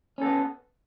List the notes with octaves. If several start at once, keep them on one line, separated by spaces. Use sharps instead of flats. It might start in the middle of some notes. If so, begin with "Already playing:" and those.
B3 C#4 A4